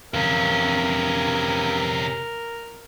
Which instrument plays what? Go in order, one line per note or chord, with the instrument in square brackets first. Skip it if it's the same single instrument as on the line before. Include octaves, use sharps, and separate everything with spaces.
[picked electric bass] F2 E3 [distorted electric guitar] C3 C#4 [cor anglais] A#4 [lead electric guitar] B4 F5